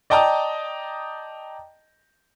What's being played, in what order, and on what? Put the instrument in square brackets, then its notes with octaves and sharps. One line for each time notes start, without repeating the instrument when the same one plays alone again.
[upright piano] D5 D#5 G5 A5 A#5 D#6